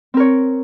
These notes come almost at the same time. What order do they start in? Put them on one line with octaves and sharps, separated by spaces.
C4 A#4 C#5